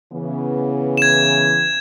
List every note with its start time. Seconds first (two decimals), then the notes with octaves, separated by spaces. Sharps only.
0.13 C#3 E3 B3
0.97 G#6 E7